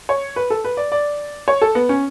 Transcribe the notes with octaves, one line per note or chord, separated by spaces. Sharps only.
C#5
B4
A4
B4
D5
D5
C#5
A4
B3
C#4